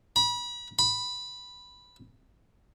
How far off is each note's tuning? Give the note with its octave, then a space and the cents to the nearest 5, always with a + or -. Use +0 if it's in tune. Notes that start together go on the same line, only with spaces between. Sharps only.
B5 -30
B5 +0